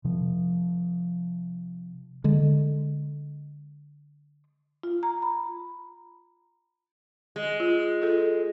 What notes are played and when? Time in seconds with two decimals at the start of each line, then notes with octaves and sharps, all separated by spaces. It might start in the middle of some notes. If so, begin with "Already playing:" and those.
0.04 C3 F3
2.24 D3 G#3
4.83 F4
5.03 A#5
5.22 B5
7.36 G#3
7.60 F4
8.02 F4 A4